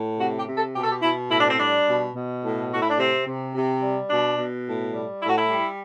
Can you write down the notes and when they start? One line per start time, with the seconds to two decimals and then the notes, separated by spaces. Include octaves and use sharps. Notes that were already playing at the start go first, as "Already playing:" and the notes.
Already playing: A2
0.19 C3 F#4
0.38 G4
0.48 C3
0.57 A4
0.75 B2 G4
0.83 A4
0.91 G4
1.03 B2 E4
1.31 A2 E4
1.40 D4
1.49 C4
1.59 G3 D4
1.87 B2
2.15 B2
2.43 A2
2.71 A2 F#4
2.82 E4
2.90 D4
2.98 C3 C4
3.27 C3
3.54 C3
3.82 G3
4.10 B2 D4
4.37 B2
4.66 A2
4.94 G3
5.21 A2 E4
5.29 F#4
5.38 E4
5.49 G3